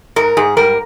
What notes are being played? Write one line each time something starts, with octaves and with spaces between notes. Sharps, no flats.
G#2 A#4
G#2 G#4
G3 A#4